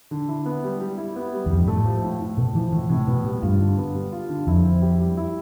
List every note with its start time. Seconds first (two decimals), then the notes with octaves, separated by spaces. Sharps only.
0.11 D3
0.28 E4
0.46 B3
0.64 G3
0.80 G3
0.98 E4
1.16 B3
1.33 G3
1.46 E2
1.50 F2 G3
1.60 G2
1.68 A2 A3
1.85 F3
2.02 A2
2.20 A2
2.37 B2 A3
2.55 E3 F3
2.72 A2 E3
2.89 A2 C3
3.07 B2 B3
3.25 G3
3.42 G2 F4
3.60 D3
3.77 B3
3.95 G3
4.12 F4
4.29 D3
4.47 F2 E4
4.64 C4
4.82 G4
5.00 G3
5.17 E4